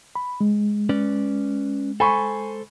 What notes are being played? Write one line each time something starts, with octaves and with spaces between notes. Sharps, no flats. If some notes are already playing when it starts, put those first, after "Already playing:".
B5
G#3
C#4 B4 D5
A4 C5 G#5 B5 C#6